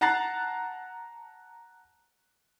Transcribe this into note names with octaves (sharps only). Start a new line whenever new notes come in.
F#5 A5 A#5 F#6 A6 C7